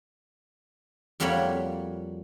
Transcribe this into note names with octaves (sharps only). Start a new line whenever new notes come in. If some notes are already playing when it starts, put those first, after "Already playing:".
F2 G3 A#3 F#4 C#5 B5